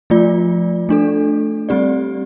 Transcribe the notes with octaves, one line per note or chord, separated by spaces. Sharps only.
F3 A3 F4 D5
A3 D4 A4
G3 C4 G4 D5